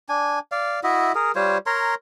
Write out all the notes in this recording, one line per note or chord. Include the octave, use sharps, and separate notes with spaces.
D4 G#5
D5 F5
E4 F#4 D#5 E5
G#4 A#4
G3 F4 C5 C#5
A#4 C#5 A#5 C6